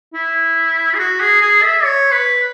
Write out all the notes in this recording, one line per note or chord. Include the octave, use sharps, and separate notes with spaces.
E4
G#4
F#4
G#4
G#4
E5
C#5
B4